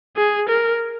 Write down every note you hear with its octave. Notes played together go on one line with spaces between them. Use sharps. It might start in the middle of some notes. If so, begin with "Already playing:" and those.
G#4
A#4